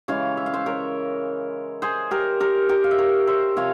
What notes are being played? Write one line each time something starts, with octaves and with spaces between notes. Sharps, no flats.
C#3 E3 G#3 C#5 F5
E5
F5
C5 E5
A#4 C#5
G#4 C5
G4 A#4
G4 A#4
G4 A#4
F5
E5
A#4 C#5
C5 E5
C3 F3 C#5 F5